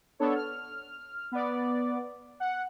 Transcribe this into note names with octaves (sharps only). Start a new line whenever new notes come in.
B3 D4 A4 C#5
F6
B3 D5
F#5